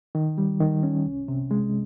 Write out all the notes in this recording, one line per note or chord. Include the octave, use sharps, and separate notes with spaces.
D#3
G3
D#3
C#4
C2
C3
G#3